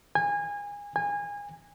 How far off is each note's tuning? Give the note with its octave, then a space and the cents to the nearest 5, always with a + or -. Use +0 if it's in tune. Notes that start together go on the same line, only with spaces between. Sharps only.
G#5 -25
G#5 -25